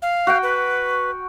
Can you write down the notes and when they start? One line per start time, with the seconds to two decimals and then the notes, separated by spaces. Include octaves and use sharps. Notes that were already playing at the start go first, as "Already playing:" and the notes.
0.02 F5
0.27 F#4 F#5 G5
0.43 B4